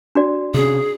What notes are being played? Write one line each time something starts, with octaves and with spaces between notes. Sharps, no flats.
D4 F#4 D5
C3 C#4 G#4